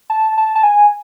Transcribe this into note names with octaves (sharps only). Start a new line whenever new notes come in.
A5
A5
A5
G#5